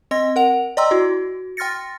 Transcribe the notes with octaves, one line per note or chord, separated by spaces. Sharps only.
C4 D#5 C6 A#6
A#4 F#5 F7
D5 D#5 G5 A#5 C6 E6
E4 F#4
G5 C6 F6 A6 A#6 C#7